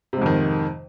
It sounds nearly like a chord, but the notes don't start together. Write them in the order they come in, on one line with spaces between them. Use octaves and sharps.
C3 G#2 F2 D#3